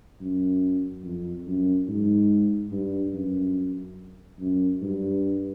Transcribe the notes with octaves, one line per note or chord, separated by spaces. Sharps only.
F#2
F2
F#2
G#2
G2
F#2
F#2
G2